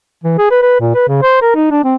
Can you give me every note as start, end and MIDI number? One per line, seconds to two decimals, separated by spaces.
0.24 0.36 52
0.38 0.47 68
0.51 0.60 71
0.63 0.78 71
0.80 0.90 46
0.95 1.06 71
1.08 1.19 49
1.22 1.39 72
1.42 1.54 70
1.55 1.68 63
1.71 1.80 62
1.84 1.96 60